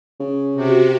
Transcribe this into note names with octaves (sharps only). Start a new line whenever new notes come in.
C#3
C3 F#4 G4